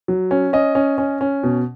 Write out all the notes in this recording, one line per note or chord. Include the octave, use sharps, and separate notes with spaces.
F#3
C#4
C#4 D#5
C#4
C#4
C#4
B2